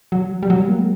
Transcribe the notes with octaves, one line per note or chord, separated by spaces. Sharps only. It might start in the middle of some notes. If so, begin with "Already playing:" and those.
F#3
G3
F#3
A#3
G#3